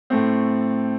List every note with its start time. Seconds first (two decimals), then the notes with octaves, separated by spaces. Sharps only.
0.10 A2 A3 C4